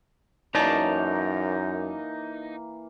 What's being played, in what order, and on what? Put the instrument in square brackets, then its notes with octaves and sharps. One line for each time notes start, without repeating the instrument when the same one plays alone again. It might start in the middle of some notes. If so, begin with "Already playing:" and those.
[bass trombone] F#2 [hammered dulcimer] E3 A#3 [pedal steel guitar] D#4 [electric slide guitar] C#5 D5 A5